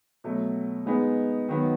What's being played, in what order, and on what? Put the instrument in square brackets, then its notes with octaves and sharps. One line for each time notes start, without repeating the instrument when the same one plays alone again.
[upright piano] B2 F#3 A3
G#3 B3 D#4 G#4
D#3 F#3 B3 F#4